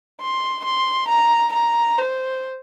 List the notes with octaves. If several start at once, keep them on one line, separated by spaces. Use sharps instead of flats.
C6
C6
A#5
A#5
C5